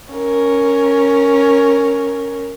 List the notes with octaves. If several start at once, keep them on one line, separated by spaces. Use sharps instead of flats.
C#4 A#4